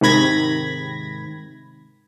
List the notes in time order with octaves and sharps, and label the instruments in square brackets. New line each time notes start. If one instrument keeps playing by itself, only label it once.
[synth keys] G#2 C3 D#3 B5 G#6 A#6